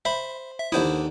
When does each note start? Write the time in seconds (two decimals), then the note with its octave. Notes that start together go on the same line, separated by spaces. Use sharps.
0.05 C5 E5 B5
0.58 E5
0.72 D#2 D3 E4 C5 D#6